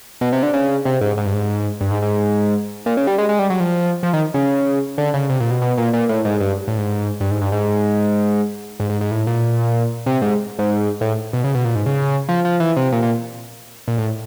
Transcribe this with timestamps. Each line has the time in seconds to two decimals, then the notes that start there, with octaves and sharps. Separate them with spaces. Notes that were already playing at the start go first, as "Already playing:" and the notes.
0.21 B2
0.33 C3
0.43 D3
0.53 C#3
0.85 C3
1.01 G#2
1.17 G#2
1.26 G2
1.34 G#2
1.81 G2
1.91 G#2
2.02 G#2
2.86 A#2
2.97 C#3
3.07 G3
3.18 G#3
3.29 G#3
3.39 G3
3.50 F#3
3.60 F3
4.03 F3
4.13 D#3
4.34 C#3
4.98 D3
5.14 C#3
5.29 C3
5.40 A#2
5.51 B2
5.62 B2
5.77 A#2
5.93 A#2
6.09 A2
6.25 G#2
6.40 G2
6.68 A2
6.78 G#2
7.21 G2
7.31 G#2
7.41 G2
7.52 G#2
8.80 G#2
8.90 G#2
9.01 G#2
9.11 A2
9.27 A#2
10.06 C3
10.22 G#2
10.59 G#2
11.01 A2
11.33 B2
11.44 C#3
11.55 B2
11.65 A#2
11.75 G#2
11.86 C#3
12.29 F3
12.45 F3
12.60 E3
12.77 C3
12.92 A#2
13.02 A#2
13.88 A#2
13.98 A2